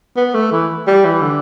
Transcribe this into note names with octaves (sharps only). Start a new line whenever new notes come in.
B3
A3
E3
G3
E3
D3